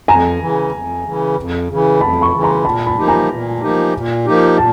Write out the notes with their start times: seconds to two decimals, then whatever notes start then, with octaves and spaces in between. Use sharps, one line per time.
0.08 F2 G#5 A#5
0.39 C#3 E3
0.72 F2
1.04 C#3 E3
1.36 F2
1.69 C#3 E3
2.01 F2 A5 B5
2.21 B5 C#6
2.33 C#3 E3
2.43 A#5 C6
2.64 A#2 A5 B5
2.87 A5 B5
2.97 F3 A#3 D#4 G4
3.08 G#5 A#5
3.30 A#2
3.61 F3 A#3 D#4 G4
3.94 A#2
4.26 F3 A#3 D#4 G4
4.57 A#2 A5